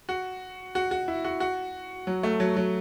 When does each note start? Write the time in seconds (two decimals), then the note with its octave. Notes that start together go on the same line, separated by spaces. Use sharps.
0.09 F#4
0.75 F#4
0.91 F#4
1.08 E4
1.24 F#4
1.40 F#4
2.07 F#3
2.23 A3
2.40 F#3
2.57 F#3